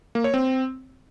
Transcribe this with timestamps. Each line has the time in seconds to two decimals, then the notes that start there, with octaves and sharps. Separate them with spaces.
0.15 A#3
0.24 C#5
0.34 C4